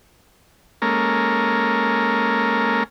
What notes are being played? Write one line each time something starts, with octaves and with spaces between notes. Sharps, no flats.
G#3 A#3 C#4 A4 A#4